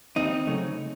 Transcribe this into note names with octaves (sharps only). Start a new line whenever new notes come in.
D#2 C4 D#4
C#3 F#3 A3